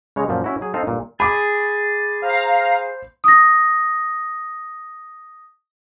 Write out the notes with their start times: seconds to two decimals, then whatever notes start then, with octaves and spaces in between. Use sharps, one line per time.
0.16 C#3 G#3 C#5 A#5
0.28 F#2 A#2 F3
0.44 C#4 E4 F#4
0.61 F#3 G#4
0.74 C4 D#4 A4 F5
0.87 G1 A#2
1.20 G#4 B5 D6 A6
2.22 C5 F5 A#5 C7
3.24 D#6 A#6